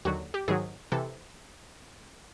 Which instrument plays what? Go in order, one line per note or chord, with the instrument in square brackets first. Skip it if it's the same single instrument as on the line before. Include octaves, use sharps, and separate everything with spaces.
[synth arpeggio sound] D#2 D3 F#3 F#4
G4
G#2 D#3 F#3 G#4
C3 E3 A4